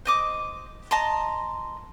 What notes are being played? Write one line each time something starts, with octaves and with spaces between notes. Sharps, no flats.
C5 D#5 D6
D#5 A5 A#5 C6